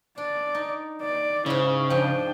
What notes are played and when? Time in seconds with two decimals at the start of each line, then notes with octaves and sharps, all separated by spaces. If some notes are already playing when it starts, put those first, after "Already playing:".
0.18 D4 D5
0.55 D#4
1.02 D5
1.46 G#2 C#3 C#4 E4
1.90 G#2 F3 D4 G5